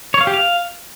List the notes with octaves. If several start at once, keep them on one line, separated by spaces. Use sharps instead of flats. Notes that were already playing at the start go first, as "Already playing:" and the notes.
C#5
F5
G4
F5